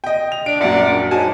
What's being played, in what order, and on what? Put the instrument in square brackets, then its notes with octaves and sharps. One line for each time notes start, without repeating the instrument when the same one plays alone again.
[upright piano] D#5 G5
F7
[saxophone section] D4 [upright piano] D7
[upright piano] A#1 F#2 [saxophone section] D5 F#5
[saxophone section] G#2 F#3 G#3 [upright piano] F#4 G#5 A5